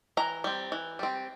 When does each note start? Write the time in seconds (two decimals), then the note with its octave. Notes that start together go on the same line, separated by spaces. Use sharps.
0.17 E3 A#5
0.44 G3 C4
0.72 E3
0.99 G3 C4